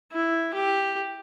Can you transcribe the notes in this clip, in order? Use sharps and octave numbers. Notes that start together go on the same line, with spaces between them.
E4
G4